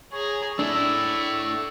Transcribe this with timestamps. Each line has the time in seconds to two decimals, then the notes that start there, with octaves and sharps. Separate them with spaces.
0.12 G#4 C#5 A#5
0.59 A3 D4 E4 D5 C#6 E6